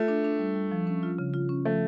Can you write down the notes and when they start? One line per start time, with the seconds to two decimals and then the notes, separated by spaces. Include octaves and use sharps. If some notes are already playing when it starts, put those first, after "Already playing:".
Already playing: A3 F4
0.08 D4
0.24 D4
0.39 G3
0.55 G3
0.72 F3
0.87 C#4
1.03 F4
1.19 C#3
1.34 F4
1.49 C#4
1.65 F3 A3